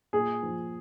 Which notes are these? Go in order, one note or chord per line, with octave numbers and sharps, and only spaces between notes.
A#2 G#4
F3